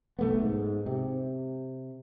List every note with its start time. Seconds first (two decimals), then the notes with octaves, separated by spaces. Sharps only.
0.19 B1 A3 B3
0.41 G#2
0.86 C3